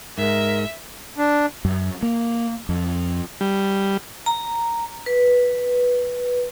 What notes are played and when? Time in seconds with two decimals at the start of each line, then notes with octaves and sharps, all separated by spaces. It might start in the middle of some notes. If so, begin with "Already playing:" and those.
0.18 G#2 G#3 A#4 E5
1.18 D4
1.65 F#2
2.03 A#3
2.69 F2
3.41 G3
4.26 A#5
5.06 B4